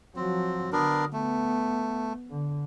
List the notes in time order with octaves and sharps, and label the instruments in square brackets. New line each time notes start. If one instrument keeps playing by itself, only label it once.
[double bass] F3 F#3 [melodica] C4
[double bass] D3 [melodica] B3 D4 A#4
[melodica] A3 [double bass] B3
[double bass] D3